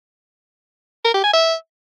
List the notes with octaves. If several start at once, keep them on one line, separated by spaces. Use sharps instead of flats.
A#4
G4
G#5
E5